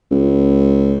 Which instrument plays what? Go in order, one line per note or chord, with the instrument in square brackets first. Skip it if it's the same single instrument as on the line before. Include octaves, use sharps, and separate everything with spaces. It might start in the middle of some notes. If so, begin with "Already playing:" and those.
[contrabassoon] C#2